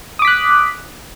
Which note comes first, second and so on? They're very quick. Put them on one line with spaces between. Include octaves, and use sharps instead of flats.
D#6 D6 B6 F#6